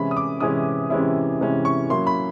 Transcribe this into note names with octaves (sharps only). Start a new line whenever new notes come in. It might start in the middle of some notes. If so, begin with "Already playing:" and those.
Already playing: C3 E3 G#3 C#4 E4 B5
D#6
D6
C3 E3 G#3 C#4 E4 D#6
C3 E3 G#3 C#4 E4
C3 E3 G#3 C#4 E4
C#6
F#3 A#3 C#4 E4 C6
B5